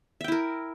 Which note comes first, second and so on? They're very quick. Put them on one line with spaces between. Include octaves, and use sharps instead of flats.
E5 G5 E4 A#4